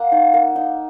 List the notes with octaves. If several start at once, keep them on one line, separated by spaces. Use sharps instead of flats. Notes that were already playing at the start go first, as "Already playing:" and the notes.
Already playing: A#3 F#5
D#4
A#3
D#4